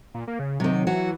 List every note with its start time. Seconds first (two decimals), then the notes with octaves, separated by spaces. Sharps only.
0.14 A#2
0.27 A#3
0.39 C#3
0.60 C3 D#3 F#3
0.87 E3 F#3 F#4